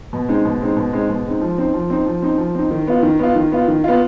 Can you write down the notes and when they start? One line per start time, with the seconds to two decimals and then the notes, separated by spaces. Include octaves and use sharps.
0.13 B2
0.29 G#3 C4 D#4
0.45 B2
0.61 G#3 C4 D#4
0.77 B2
0.93 G#3 C4 D#4
1.09 B2
1.25 G#3 C4 D#4
1.41 F3
1.58 C4 D#4
1.74 F3
1.90 C4 D#4
2.06 F3
2.22 C4 D#4
2.38 F3
2.55 C4 D#4
2.71 D#3
2.87 B3 F4
3.03 D#3
3.19 B3 F4
3.35 D#3
3.52 B3 F4
3.68 D#3
3.84 B3 F4